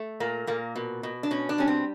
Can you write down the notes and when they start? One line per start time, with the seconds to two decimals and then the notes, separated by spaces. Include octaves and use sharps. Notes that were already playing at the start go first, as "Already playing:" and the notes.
Already playing: A3
0.20 A#2 A#3
0.47 A#2 A#3
0.76 B2
1.03 B2
1.23 D4
1.31 B2 C#4
1.49 D4
1.58 G3 C#4
1.68 C4